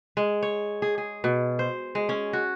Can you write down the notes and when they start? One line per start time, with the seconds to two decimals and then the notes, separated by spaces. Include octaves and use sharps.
0.17 G#3
0.43 C#5
0.82 G#4
0.98 G#4
1.24 B2
1.59 C5
1.95 G#3
2.09 C#4
2.33 F#4